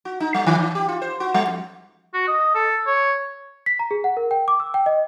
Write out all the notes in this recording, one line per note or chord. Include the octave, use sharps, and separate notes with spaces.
F#4
D#4
G3
D#3
E3
G4
F4
C5
F#4
G3
F2
F#4
D#5
A4
C#5
B6
A#5
G#4
F#5
A#4
G5
D6
E6
G5
D#5